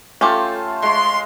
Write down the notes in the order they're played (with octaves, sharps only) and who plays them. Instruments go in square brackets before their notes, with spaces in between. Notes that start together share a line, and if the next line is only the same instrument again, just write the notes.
[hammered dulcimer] A3 F4 C5 [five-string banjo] C#4 G4
[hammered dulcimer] G#3 C#5 [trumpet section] C6